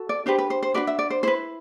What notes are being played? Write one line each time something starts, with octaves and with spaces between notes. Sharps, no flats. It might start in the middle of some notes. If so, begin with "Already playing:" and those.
Already playing: F#4 A4
D5
D4 G4 B4 C5
B4
C5
C5
D4 F#4 B4 D5
E5
D5
C5
E4 B4 C5